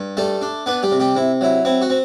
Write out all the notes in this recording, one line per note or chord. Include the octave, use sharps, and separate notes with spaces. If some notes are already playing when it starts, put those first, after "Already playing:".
Already playing: G2
G3 A3 A4
D4
B3 D4 B4
G3 G4
C3
G3 G4
C3 E4
F#3 E4
C4 E4
F#4
C4